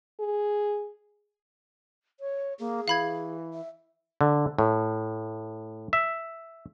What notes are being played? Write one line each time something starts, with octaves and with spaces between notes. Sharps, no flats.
G#4
C#5
A#3 G#4
E3 F5 B5 G#6
E5
D3
A2
E5